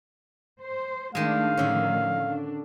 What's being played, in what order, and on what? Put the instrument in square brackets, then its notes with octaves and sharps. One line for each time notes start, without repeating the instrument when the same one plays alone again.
[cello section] C5
[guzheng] D#3 G#3 [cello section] A3 D4 [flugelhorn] F5
[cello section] A2 D#3 F3 [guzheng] D3 C#4
[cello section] D4